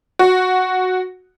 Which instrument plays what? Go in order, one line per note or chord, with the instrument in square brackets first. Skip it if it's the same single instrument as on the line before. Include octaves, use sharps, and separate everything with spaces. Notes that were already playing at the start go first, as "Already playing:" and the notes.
[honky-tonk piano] F#4